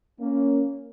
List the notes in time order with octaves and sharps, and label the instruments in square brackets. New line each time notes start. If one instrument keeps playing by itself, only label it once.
[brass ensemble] A#3 C#4